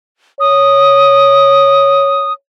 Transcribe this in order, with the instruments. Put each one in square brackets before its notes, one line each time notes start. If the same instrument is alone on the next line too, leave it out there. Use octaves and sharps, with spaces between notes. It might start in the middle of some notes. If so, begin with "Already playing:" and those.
[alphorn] C#5 [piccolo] D#6